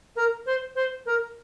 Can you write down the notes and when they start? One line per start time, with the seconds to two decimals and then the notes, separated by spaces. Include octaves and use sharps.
0.16 A#4
0.46 C5
0.76 C5
1.06 A#4